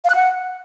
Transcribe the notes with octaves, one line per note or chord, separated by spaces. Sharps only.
F5
F#6
F#5